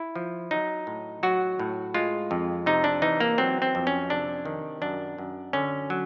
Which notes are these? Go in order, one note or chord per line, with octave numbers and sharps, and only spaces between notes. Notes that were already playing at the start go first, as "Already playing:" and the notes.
Already playing: E4
F3
F#3 D#4
A2
F#3 F#4
A2
G#3 F4
F2
C3 D#4
D4
E3 D#4
A#3
F#3 C4
C4
F2
C#4
C3 D4
D#3
F#2 D4
F#2
D3 C#4
F#3